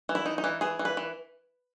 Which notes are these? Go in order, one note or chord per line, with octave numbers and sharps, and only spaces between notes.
E3
E4
D#4
D#4
E3
E3 G#4
E3
B4
E3